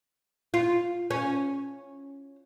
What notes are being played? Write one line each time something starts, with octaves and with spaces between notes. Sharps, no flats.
F4
C#4